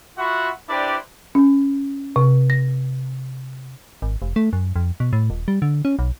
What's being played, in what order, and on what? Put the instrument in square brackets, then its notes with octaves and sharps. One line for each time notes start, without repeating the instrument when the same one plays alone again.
[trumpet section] F4 F#4 E5 F#5 B5 C#6
D4 E4 G4 B4 C5 D5
[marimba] C#4
C3
A#6
[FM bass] G#1
F1
A3
F#2
F2
B2
A2
D#1
G3
D3
C#4
B1